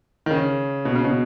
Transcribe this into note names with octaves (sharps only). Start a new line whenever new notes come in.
D#3
C#3
B2
C#3
B2